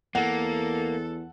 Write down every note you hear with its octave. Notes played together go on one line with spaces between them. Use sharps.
E2 A#3 A4 F#5